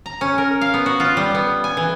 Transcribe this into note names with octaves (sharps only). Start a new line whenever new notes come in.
A#5
C#4
A#4
F5
B3
F#4
F4
G3
B3
G#5
E3